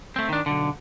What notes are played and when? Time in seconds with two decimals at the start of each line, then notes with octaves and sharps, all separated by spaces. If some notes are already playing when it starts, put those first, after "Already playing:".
0.16 A3 C4
0.29 D#3 D4
0.46 B1 D3